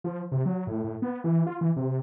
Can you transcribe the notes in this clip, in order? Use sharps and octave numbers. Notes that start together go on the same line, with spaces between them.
F3
C3
F#3
A2
A2
B3
E3
F4
E3
C3